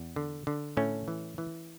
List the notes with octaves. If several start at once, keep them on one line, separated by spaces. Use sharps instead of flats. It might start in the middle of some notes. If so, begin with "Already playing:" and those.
Already playing: E2
D3
D3
A2 A3 C#4
E3
E3